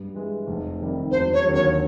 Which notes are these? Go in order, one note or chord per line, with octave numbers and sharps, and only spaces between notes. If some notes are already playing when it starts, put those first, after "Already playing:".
Already playing: G2
E3 G#3
F1
F2 C3 D#3 G3
E1 C5
C#5
D#2 D3 F#3
C#5